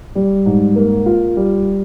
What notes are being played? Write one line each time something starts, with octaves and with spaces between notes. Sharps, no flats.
G3
G#2
A#3
F4
G3